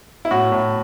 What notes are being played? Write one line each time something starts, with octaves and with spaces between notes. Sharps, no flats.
E4
A2 F#4
A2